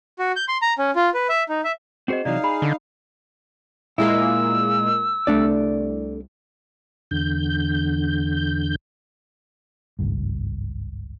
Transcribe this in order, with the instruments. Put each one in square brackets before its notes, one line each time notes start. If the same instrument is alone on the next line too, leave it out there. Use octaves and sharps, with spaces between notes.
[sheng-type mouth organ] F#4
G6
C6
A#5
C#4
F4
B4
E5
D#4
E5
[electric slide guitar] C4 F#4 C5 [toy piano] G#4 D#5
[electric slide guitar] C3 E3 F#3 [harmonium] D#4 F5 [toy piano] D5
[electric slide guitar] G#4 [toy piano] B5
[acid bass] D3
[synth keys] A#2 G#3 A#3 [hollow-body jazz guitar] E4 [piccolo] E6
[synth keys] C2 [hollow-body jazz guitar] A3 D4 D5
[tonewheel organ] E2 D3 G6
[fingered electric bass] G#1 C#2 G2